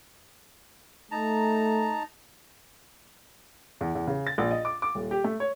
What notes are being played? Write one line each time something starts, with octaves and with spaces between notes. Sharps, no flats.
A3 D#4 A5 A#5
E2
E2
C#3
A6
A#1
D#5
D6
D6
D#1
G4
A3
C#5